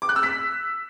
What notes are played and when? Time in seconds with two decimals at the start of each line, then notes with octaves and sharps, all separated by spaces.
0.02 D6
0.09 F#6
0.16 E6
0.23 B6